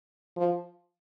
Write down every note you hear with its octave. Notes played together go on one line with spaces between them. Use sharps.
F3